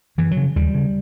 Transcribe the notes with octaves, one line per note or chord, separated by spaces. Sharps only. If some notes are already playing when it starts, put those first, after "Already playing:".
F#2 E3
F#3
C#3
D#2 G3
C#3